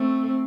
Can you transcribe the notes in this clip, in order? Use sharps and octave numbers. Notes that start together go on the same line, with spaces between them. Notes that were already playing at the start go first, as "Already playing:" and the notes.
Already playing: A3 C4